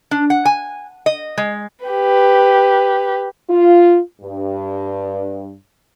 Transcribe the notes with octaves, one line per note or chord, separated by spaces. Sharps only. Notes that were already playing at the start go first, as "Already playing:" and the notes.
D4
F#5
G#5
D#5
G#3
G4 B4
F4
G2